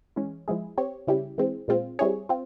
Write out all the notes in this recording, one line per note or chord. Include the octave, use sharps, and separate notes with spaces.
E3 G#3 C#4
F3 G#3 E4 G#4
C4 G4 C#5
C#3 G3 C#4 E4 G4
E3 G#3 C4
A#2 G#3 C4 F4
G3 C4 E4 G#4 C#5
C4 F4